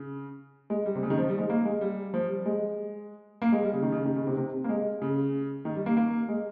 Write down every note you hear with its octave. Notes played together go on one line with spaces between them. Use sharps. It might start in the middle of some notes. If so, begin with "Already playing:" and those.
Already playing: C#3
G#3
G3
C3
C#3
D#3
F3
G3
G#3
A#3
G#3
G3
F3
G3
G#3
A#3
G#3
G3
C#3
D#3
C#3
D#3
C#3
C3
C3
A#3
G#3
C#3
D#3
G3
A#3
A#3
G#3